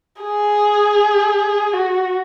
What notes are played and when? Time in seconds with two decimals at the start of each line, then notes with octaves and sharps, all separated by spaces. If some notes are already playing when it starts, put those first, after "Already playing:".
0.22 G#4
1.73 F#4